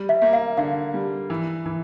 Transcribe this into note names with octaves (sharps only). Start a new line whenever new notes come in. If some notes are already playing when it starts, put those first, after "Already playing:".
Already playing: G3
E5
A#3
F5
D3 F5
G3
E3
E3